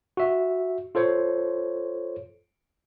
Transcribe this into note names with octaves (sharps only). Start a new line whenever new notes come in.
F#4 E5
F4 A4 C5 C#5